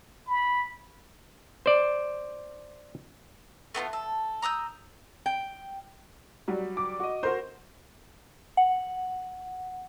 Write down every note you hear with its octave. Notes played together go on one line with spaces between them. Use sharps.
B5
C5 D5
A3 B3 D#4 F4
A4
A#5 D#6 E6 G6
G5
F#3 G3
D6
F#4 D#5
F#4 A#4 C5 C6
F#5